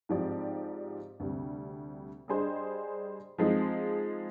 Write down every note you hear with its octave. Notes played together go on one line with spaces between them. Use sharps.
G#2 F3 C4 G4 D5
D2 C3 G3
G3 D4 G#4 C5 D#5
F3 G#3 C4 D#4